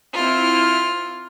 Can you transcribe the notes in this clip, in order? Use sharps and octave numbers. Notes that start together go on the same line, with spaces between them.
C4 E4 F4 F6